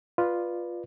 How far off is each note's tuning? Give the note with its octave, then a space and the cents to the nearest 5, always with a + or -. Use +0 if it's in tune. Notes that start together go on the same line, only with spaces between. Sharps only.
F4 +0 B4 -10 D5 +25